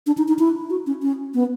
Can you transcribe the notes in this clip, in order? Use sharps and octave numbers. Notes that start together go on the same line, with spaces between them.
D4
D#4
D#4
E4
F#4
C#4
C#4
B3